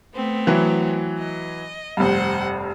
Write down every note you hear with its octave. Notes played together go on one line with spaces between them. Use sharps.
A3 B3 C4
E3 F#3
D#5
F1 G2 C5 F#5